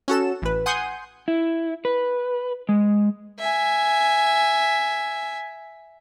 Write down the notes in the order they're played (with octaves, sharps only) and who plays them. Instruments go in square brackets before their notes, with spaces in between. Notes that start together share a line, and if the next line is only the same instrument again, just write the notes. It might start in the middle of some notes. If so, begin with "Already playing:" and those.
[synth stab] C#4 F#4 A4 E7
A1 B4
F#5 G#5 C6 D#6 G6
[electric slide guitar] E4
B4
G#3
[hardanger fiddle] E5 G#5